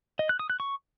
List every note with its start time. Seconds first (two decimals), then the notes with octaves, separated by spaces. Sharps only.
0.19 D#5
0.29 F#6
0.39 D#6
0.50 F#6
0.60 C#6